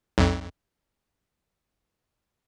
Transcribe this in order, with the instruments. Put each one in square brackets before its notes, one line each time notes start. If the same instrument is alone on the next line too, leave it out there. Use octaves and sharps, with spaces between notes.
[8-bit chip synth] B1 F2